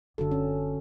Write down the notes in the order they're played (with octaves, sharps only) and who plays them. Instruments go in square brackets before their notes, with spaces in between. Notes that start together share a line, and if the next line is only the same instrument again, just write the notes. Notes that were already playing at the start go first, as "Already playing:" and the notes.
[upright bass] F#1 [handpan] D3 F#4 A4
[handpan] C#4